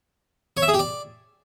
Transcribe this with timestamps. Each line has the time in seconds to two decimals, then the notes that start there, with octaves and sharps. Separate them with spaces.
0.57 C#5
0.62 E5
0.68 G#4
0.74 G4
0.79 D5